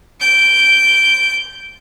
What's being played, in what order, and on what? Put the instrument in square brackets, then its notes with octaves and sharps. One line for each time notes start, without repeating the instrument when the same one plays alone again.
[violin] G6 D7